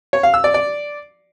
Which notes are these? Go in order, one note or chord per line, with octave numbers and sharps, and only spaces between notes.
C#5
F5
E6
D5
D5